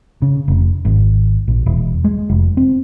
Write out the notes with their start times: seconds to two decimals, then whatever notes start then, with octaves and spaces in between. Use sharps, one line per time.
0.22 C#3
0.48 F1
0.85 G#1
1.48 A#1
1.66 E1
2.04 G#3
2.29 F1
2.57 C4